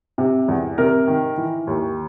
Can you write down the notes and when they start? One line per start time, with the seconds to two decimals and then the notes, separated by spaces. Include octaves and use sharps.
0.18 C3
0.48 E2
0.78 C3 A#4
1.07 D#3
1.37 E3
1.67 D#2